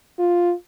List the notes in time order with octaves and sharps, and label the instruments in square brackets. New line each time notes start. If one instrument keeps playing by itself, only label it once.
[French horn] F4